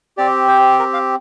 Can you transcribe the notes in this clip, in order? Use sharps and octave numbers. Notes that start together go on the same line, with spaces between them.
C4 G4 D5
C5
A#4
F5